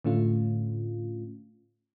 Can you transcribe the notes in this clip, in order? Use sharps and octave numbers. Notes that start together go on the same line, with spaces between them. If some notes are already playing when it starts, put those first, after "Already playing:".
A2 D3 A3 C#4 F4